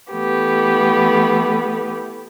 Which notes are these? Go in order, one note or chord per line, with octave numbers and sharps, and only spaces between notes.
E3 A3 B3 G4